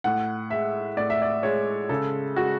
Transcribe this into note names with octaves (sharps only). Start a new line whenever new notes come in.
A2 F#5
G#3 E5
A2 D5
E5
D5
G#3 C#5
C#3 A4
G#3 F#4